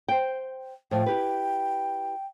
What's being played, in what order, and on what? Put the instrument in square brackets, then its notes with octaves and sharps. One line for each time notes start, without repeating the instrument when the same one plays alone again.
[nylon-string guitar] C5 G5
[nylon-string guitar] A2 F3 [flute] G5
[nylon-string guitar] E4 G4 B4